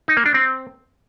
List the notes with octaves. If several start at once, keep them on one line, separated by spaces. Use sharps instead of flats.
D#4
A#3
D4
C4